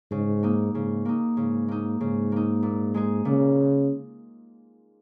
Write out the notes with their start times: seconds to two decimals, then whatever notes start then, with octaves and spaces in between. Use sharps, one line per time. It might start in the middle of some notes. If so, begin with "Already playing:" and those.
0.11 G#2 C#3
0.43 A#3 D#4
0.74 G#2 C#3
1.05 A#3 D#4
1.37 G#2 C#3
1.68 A#3 D#4
2.00 G#2 C#3
2.32 A#3 D#4
2.63 A#2
2.94 G#3 D#4 G#4
3.25 A#2 C#3